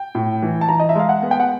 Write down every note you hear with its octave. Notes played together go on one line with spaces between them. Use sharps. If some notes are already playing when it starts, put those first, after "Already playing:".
Already playing: G5
A2
E3
A5
E3 A#5
D#5
E5
G#3 F5
F#5
B3
G5
F#5